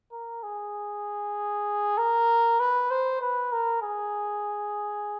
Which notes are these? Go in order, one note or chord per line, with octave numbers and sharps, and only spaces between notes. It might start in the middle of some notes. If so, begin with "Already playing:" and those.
A#4
G#4
A#4
B4
C5
B4
A#4
G#4